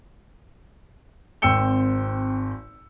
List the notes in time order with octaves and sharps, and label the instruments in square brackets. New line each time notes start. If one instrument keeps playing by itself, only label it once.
[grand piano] G#1 C4 G5 E6 C#7 G7